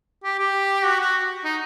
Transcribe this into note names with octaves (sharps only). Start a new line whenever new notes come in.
G4
G4
F#4
F#4
D#4